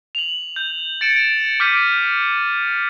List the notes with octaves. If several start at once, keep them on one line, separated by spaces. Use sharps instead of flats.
F7 F#7
G6
A6 C#7 D7 E7
D7
D6 F6 G6 B6 D7 D#7